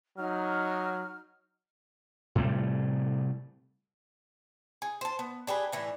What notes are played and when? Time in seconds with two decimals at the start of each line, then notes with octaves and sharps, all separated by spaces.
0.18 F#3 D#4 F6
2.35 A2 C3 G3 A3
4.82 G#4
5.01 C5 A5
5.19 B3
5.47 D4 G4 G#4 B4
5.72 A2 E3 D4